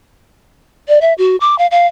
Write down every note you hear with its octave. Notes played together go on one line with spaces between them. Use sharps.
D5
E5
F#4
D6
F5
F5